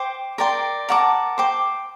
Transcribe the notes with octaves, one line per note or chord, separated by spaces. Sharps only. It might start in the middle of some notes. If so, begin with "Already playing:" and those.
Already playing: C5 G5 D6
A#4 D5 G5 C6
A#4 F#5 A5 D6
C5 G5 D6